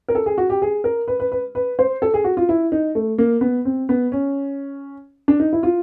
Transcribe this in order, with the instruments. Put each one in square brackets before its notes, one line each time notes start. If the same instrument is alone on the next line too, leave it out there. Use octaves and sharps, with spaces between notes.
[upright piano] A#4
A4
G#4
F#4
G4
G#4
A#4
B4
B4
B4
B4
C5
A4
G#4
F#4
F4
E4
D#4
A3
A#3
B3
C4
B3
C#4
D4
D#4
E4
F4